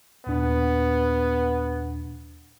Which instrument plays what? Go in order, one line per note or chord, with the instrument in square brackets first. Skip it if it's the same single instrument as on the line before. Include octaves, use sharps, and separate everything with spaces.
[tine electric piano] D#2 A#2 D4 [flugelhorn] B3